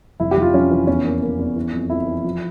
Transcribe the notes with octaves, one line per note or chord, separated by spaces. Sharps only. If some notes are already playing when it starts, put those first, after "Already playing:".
F1 E4
G4
F1
F4
F1 C#4
E3
E2 C#4
A#3
A#3
E2
E3
F2
F2 E4
E3
F3